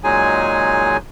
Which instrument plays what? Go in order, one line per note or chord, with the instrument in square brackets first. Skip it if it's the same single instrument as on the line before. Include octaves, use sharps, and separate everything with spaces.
[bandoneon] A#2 F#3 G#3 D#4 G#4 G#5